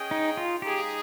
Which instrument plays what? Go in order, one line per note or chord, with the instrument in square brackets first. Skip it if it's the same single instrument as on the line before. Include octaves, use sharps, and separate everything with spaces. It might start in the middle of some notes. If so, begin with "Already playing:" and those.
Already playing: [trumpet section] C#4 G#4 D#5 G5
[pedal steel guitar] D#4
F4
[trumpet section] G#3 D#4 G#4 [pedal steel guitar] G4